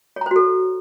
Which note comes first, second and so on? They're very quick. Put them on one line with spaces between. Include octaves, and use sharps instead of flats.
C#5 A#5 C5 F#4 A4